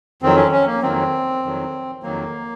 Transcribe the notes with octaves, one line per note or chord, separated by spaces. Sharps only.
F2 D#3 F#3 C4
C#4
C#4
A#3
F2 D#3 F#3 C4
F2 D#3 F#3
F2 D#3 F#3 A#3